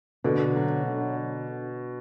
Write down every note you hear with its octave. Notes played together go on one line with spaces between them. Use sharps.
B2 D3
F#3
D3